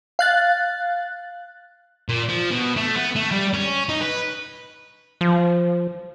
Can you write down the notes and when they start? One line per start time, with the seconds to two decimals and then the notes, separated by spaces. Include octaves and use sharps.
0.19 F5 F#6 A6
2.09 A#2
2.29 F3
2.51 B2
2.76 A3
2.96 B3
3.16 A3
3.31 G3
3.54 C#4
3.89 D#4
4.01 B4
5.21 F3